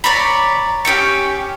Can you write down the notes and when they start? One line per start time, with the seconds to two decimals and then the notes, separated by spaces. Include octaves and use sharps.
0.04 C#5 D5 A#5 B5
0.85 C#4 G4 G5 C#6